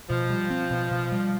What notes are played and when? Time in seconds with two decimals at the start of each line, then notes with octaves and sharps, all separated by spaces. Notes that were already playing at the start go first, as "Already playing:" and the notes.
0.10 B2 F3
0.30 G3
0.50 C4
0.71 B2
0.91 B2
1.12 G3